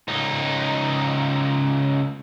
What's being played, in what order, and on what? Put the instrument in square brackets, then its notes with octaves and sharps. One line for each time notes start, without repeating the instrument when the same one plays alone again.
[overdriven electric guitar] C#2 D#4